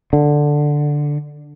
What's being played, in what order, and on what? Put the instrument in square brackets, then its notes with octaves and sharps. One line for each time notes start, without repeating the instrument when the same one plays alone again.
[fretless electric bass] D3